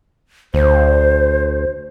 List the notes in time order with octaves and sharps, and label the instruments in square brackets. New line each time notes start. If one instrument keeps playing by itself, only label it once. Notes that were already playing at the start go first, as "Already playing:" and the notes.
[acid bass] D2 [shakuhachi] C5